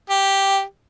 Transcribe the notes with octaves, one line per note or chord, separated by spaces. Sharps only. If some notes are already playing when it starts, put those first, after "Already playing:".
G4